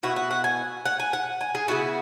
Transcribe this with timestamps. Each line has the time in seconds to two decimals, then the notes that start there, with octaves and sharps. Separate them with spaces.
0.03 B2 B3 E4 F#4
0.16 F#4
0.31 F#5
0.44 G#5
0.86 F#5
1.00 G#5
1.13 F#5
1.41 G#5
1.55 G#4
1.68 C#3 F#3 B3 E4 F#4